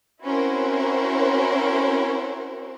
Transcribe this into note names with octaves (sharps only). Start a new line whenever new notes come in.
C4 C#4 E4 F#4 A#4 C5